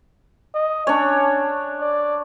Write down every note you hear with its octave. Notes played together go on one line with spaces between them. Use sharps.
D#5
C#4 D4 C#5
D5